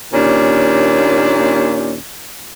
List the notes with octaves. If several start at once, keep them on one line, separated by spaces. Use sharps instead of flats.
D#2 A#2 C#4 D4